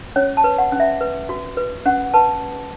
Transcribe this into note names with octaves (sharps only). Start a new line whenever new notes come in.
C#4 C#5
A5
B4
F#5
C#4
E5
B4
F#4
B4
C#4 F#5
B4 A5